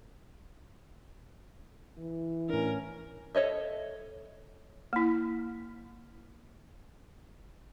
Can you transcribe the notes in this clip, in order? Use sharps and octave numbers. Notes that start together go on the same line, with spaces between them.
E3
A2 C#4 D4 A#4
A4 C#5 D#5 E5
A#3 E4